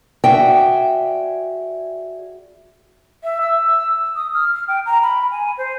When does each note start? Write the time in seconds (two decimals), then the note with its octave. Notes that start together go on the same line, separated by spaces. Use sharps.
0.24 F#4 G#4 D5 E5 G5
3.24 E5
3.41 E6
4.16 D#6
4.34 F6
4.54 F6
4.68 G5
4.86 A#5
5.03 B5
5.31 G#5
5.58 C5